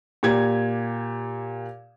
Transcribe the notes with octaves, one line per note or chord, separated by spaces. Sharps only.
A#2 G4 G#6